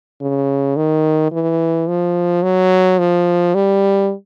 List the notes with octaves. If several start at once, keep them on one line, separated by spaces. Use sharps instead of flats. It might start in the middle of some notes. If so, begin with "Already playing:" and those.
C#3
D#3
E3
F3
F#3
F3
G3